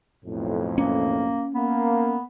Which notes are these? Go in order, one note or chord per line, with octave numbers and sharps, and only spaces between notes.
B1 F2 A2
A#3 C#4
A#3 B3